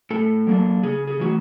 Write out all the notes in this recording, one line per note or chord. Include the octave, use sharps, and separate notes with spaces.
A2 A4
F#3 A#3 D4
C#3 G#4
G#4
E3 A3 F#4